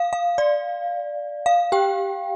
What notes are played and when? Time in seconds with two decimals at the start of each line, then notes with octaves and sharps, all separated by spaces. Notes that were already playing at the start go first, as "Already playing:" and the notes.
Already playing: F5
0.13 F5
0.38 D5
1.46 F5
1.72 G4 G5